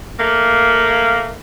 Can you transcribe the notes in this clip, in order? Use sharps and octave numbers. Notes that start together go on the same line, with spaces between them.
A3 A#3